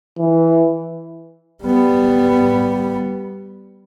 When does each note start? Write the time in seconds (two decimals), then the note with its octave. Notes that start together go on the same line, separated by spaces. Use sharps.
0.19 E3
1.63 G3 B3